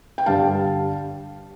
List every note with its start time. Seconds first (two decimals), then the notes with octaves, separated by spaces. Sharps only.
0.18 G5
0.26 G2 D3 G3 F5 A5